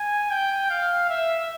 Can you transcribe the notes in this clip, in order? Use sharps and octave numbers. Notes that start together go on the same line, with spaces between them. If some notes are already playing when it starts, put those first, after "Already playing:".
Already playing: G#5
G5
F5
E5